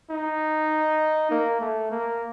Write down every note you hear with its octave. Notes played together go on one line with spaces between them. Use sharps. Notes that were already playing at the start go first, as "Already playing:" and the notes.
D#4
A#3
A3
A#3